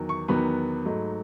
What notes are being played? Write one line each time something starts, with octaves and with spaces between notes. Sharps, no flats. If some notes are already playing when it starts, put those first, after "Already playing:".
Already playing: E2 D#3 F#3
C#6
E2 D#3 F#3 B3 B5
G#2 F#3 A3 D#4